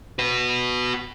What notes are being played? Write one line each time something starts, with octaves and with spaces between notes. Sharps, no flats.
F#4 B4